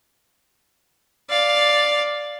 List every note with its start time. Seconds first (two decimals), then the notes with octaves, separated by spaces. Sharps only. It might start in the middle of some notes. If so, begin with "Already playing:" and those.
1.30 D5 F5